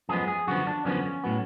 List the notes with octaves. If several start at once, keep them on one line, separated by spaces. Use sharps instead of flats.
F#2 F3 G#3 B3 G#4
G#4
F#2 D3 F3 B3 F#4
D4
F#2 D3 F3 B3 C#4
A2 F#3 B3